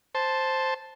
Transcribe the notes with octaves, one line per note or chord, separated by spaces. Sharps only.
C5 A5